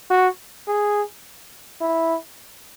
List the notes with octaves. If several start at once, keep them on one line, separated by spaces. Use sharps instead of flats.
F#4
G#4
E4